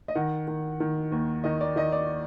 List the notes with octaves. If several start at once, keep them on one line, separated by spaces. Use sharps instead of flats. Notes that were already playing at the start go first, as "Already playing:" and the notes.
D#5
D#3 F#5
D#3
D#3
D#2
D#3 D#5
D5
D#3 D#5
D5